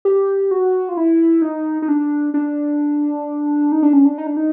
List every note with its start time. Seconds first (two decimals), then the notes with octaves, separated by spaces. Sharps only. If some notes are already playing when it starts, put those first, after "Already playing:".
0.05 G4
0.51 F#4
0.89 F4
0.97 E4
1.42 D#4
1.82 D#4
1.88 D4
2.34 D4
3.72 D#4
3.83 D4
3.93 C#4
4.05 D4
4.18 D#4
4.27 D4
4.37 D#4